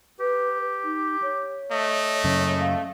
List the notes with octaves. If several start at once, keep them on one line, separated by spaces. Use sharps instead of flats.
G4 B4
D#4
C#5
A3 D#5
F#2 C#3
F5